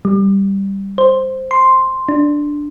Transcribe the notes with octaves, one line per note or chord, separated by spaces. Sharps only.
G3
C5
C6
D4